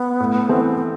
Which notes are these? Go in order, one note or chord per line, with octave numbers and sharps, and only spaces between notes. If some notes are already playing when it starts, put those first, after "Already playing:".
Already playing: B3
A2
E3 A3 C4